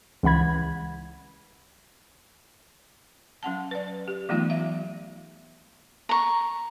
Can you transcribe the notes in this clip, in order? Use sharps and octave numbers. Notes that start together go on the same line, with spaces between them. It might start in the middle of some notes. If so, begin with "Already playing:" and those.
C#2 E3 F#5 B5 G#6
F#3 C#4 F#5 A5
B4 D5
G4
E3 F#3 A3 B3 D#4 F4
E5 F5
A#5 C#6